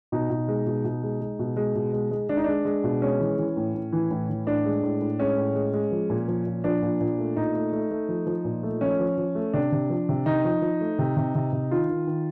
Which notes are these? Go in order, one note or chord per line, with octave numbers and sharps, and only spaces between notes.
B2 D#4
B2
G#3
B2
B2
G#3
G#3
B2
G#3
B2
G#3
G#3
G#3 D4
D#4
G#3 D4
G#3
B2
G#3 C#4
E3
E3
A2
A2
E3
A2
E3
A2 D4
G#3
A2
A2
G#3 C#4
A2
G#3
G#3
F3
A#2
F3
A#2
F3 D4
A#2
A#2
A3
A#2 D#4
A3
A3
A3
F3
F3
A#2
A3
F3 C#4
F3
F3
A3
C3 D4
C3
F3
C3
C3 D#4
F3
F3
A3
C3
C3
C3
C3
D#3 F4
D#3
D#3